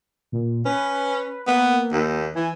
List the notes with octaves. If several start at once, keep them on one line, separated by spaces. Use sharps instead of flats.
A#2
C#4 B4
A#3 B3
D#2
E3 G#5